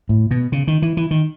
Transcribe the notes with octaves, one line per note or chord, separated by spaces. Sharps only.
A2
B2
C#3
D#3
E3
E3
D#3